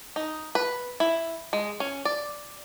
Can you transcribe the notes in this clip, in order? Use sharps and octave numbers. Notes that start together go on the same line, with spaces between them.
D#4
B4
E4
G#3
C#4
D5